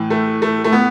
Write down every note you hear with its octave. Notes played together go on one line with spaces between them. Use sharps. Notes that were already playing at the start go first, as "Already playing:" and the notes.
Already playing: A2 E3
A3
A3
A3
B3